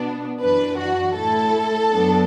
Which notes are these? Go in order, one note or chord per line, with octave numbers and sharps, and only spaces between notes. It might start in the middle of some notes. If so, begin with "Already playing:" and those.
Already playing: B2 B3 D4
F#2 E3 D4 B4
F#4
A2 A3 E4 A4
F#2 F#3 B3 D4